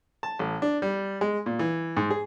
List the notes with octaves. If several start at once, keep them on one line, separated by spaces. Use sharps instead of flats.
A5
A1
D4
G3
G#3
A#2
E3
G#2
G#4